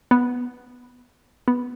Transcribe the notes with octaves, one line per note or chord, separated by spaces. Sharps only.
B3
B3